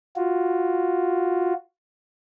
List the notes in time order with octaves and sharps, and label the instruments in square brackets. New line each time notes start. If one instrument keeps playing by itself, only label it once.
[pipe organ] F4 F#4